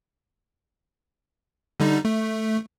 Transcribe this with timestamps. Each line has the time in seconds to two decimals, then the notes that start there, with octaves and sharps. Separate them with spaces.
1.80 D3 G3 D#4
2.05 A3